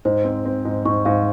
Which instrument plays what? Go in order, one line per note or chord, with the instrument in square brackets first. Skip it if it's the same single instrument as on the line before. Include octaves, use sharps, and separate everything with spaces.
[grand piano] G#2 [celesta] C5
[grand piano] C4
C4
G#2
[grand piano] G#2 [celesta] C#6
[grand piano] G#2 [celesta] F5